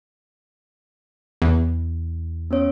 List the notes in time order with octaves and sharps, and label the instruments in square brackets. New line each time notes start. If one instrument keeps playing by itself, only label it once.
[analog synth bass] E2
[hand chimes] B3 C#4 C#5